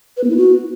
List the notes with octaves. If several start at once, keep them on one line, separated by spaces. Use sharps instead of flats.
B4
B3
E4
F#4